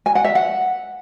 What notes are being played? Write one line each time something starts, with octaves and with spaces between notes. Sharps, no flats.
G#5
F#5
E5
F#5